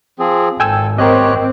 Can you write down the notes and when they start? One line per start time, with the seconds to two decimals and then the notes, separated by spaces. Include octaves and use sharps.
0.19 F3 C4 G#4
0.60 G#1 A4 G5 G#5 E6
0.98 C4 G4 A#4 C#5 D#5 F#6